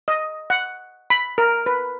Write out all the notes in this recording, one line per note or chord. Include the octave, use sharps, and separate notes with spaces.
D#5
F#5
B5
A#4
B4